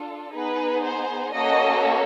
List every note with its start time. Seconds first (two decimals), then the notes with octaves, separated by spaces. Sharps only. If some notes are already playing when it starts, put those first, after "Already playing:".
Already playing: D4 F4 A4
0.33 B3 D#4 G#4 B4
0.83 C5
1.34 A#3 C#4 F#4 A4 D#5